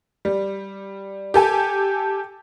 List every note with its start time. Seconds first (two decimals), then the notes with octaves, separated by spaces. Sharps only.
0.25 G3
1.34 G4 A4 G#5